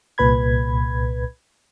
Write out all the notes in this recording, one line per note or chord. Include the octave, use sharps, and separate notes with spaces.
C2 A#2 B4 B5 G#6